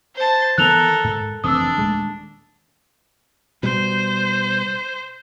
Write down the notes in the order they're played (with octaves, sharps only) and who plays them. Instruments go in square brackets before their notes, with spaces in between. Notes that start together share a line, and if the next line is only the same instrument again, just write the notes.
[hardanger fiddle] C5 A5
[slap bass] D#3 E3 B3 [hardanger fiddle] A4 A#4 [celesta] F#6 F7
[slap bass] G#2
[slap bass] F1 E3 C4 [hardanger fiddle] D4 [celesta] D#6 E6
[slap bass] D#1 G#3 A3
[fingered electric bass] B2 G3 [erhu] C5